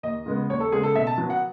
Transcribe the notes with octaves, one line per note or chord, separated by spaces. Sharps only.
D#2 D#5
C#3 G#3 B3
D#2 C#5
A4
C#3 G#3 B3 G#4
A4
B2 E5
A5
F#3 B3
F#5